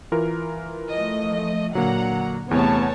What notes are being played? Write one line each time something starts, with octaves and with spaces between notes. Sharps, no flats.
E3 F4 A#4
F3 A3 D#5
A#2 D3 F#3 A#3 F#5 A#5
E2 C3 A3 B3 C#5 A5